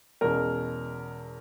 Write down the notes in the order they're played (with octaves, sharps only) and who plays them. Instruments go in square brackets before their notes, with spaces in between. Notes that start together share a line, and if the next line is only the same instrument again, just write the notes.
[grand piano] E2 B2 G#3 C#4 A#4